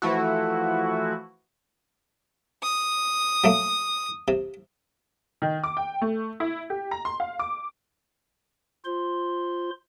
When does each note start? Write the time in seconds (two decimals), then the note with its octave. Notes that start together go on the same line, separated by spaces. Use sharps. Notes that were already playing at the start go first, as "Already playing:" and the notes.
0.02 E3 F3 A3 E4 F#4
2.63 D#6
3.44 F#3 A3 A#3
4.28 C3
5.42 D#3
5.64 D6
5.77 G5
6.02 A3
6.40 E4
6.70 G4
6.91 A#5
7.05 C6
7.20 F5
7.39 D6
8.85 F4 C5 C6